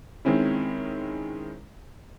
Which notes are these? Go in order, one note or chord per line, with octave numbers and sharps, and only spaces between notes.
D#3 G#3 C4 C#4 E4